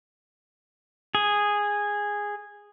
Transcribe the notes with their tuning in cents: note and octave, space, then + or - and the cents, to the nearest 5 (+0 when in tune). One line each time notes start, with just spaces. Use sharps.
G#4 -10